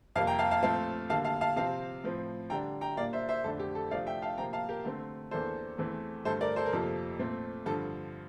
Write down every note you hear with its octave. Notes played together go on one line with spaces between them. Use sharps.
F2 C3 G3 A#3 F5 A5
G5 A#5
F5 A5
F5 A5
A#2 F3 A3 C4 F5 A5
D3 G3 A#3 F5 A5
F5 A5
F5 A5
C3 F3 C4 F5 A5
A2 F3 C4
D3 G3 D4 G5 A#5
G5 A#5
A#2 G3 A#3 D4 D5 F5
C5 E5
C5 E5
F2 D3 A3 D4 A4
G4
A4
C3 F3 A3 D4 D5 F5
E5 G5
F5 A5
C3 F3 A#3 G5 A#5
F5 A5
G4 A#4
D3 A3 C4
E2 E3 A#3 D4 A4 C5
E2 E3 A3 C4
G2 D3 A3 A4 C5
A#4 D5
A4 C5
A#4
F2 C3 F3 A#3 A4
A#2 A3 C4
G2 D3 F3 A4